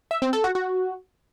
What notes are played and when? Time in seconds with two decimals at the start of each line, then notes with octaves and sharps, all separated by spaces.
0.11 E5
0.22 C4
0.33 A4
0.44 F#4
0.55 F#4